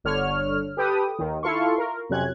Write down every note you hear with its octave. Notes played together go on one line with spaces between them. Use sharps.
G1 D3 C#5 F6
G4 A4 B4 G5 D#6
D#2 D#3
E4 F4 A4 F5 C6 C#6
A#4
F2 C3 F#3 C#4 F#6 G#6